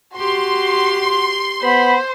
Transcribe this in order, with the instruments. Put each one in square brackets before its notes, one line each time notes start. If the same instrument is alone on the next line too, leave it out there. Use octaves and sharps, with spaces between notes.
[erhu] F#4 [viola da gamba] G4 [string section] C6
[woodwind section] B3 B5 [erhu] C5